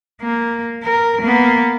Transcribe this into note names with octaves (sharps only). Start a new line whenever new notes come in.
A#3
A#4
A#3 B3